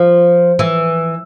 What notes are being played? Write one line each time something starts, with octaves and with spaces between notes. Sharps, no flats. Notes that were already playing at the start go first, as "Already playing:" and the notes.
Already playing: F3
E3